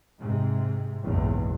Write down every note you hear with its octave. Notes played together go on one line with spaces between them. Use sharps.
G#2 C3
F#1 B1 E2 G#2